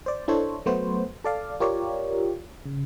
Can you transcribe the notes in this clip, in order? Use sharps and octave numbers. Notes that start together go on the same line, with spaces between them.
C5 D5
D4 E4 A4 C5 C#5
F#3 A3 B3 F#4 B4 C5
A4 D5 F5
F4 G4 A#4 C#5 D5
C#3